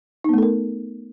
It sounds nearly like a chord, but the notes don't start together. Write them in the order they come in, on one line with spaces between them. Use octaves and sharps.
D#4 B3 A3 A4 A#4